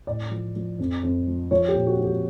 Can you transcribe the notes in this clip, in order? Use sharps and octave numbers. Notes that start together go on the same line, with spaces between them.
A2 D5
F3
F3
F2
F2
F3
F3 C#5
G4
A#2
F#4
F3
G4